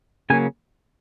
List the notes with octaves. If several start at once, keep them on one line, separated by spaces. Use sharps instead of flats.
C#3 F#3 A#3 C#4 G#5